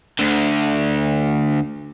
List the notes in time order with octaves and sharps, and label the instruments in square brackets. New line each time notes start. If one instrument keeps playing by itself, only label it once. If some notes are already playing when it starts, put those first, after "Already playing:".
[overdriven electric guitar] D2 D3